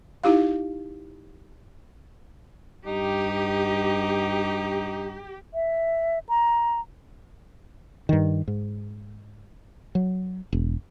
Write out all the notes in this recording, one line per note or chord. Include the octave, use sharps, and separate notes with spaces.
D#4 E4 G4 F5
G2 D#4 G4
E5
A#5
G2 D#3
G#2
F#3
E1